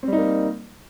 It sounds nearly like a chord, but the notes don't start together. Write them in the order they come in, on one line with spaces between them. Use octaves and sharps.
C4 G3 D#4 A#3